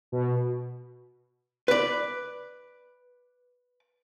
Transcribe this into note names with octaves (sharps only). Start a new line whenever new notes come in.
B2
B4 D5